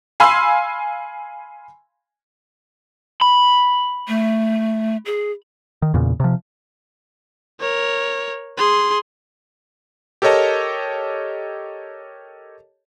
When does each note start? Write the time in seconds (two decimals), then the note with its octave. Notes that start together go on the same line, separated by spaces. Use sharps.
0.20 F5 G#5 B5 C6 E6
3.21 B5
4.08 A3
5.06 G#4
5.82 D#3
5.94 E2 A#2 C#3
6.20 C3 F3
7.60 A#4 C#5
8.58 G#4 C6
10.22 G4 A4 A#4 C#5 D#5 A5